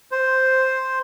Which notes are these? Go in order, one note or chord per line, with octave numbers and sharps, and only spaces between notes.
C5